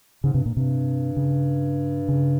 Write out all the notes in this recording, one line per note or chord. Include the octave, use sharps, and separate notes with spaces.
G#2 C#3
G2 C3
A#2
G2 C3
C#3
C#3